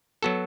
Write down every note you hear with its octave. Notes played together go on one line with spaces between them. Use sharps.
F#3 B3 F#4 A4